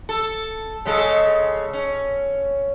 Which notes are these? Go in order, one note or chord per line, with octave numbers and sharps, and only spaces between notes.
A4
C#3 G#3 A4
C#4